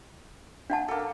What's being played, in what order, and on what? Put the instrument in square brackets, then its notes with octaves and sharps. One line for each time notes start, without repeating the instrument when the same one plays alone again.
[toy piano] D4 F#5 A5
[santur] A#3 A4